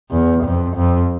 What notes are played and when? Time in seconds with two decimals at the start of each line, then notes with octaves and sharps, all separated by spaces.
0.11 E2
0.44 F2
0.76 F2